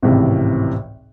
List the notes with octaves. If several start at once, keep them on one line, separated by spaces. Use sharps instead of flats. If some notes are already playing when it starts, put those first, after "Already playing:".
G#1 C#2 A2 C3 E3